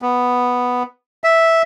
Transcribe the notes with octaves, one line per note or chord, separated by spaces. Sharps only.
B3
E5